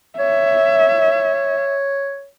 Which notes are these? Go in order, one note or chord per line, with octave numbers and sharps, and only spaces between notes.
C#5 E5